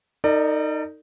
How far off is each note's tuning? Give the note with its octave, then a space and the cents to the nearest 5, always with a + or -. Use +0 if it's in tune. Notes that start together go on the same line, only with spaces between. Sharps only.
D#4 +0 A#4 -45 D5 +25